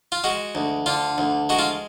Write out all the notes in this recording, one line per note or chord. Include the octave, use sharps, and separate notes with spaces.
F4
G#3 F#4
D2
D3 F4
D2
G#3 F#4
F4